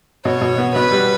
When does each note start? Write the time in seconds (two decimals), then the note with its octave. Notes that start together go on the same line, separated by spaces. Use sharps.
0.25 B2 C#5
0.41 B2
0.58 B3
0.75 B2 B4
0.92 G3